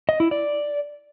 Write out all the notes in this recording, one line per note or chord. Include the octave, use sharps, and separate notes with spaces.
D#5
E4
D5